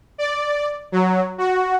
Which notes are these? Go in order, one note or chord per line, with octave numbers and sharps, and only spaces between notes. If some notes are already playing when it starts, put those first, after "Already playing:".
D5
F#3
F#4